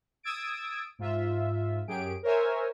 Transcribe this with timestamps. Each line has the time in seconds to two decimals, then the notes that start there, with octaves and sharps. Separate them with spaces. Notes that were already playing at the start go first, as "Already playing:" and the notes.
0.23 D#6 E6 G#6 A6 D7
0.99 G#2 F4 E5
1.88 F#2 G4 G#4 D7
2.23 A#4 C5 C#5 E5 G#5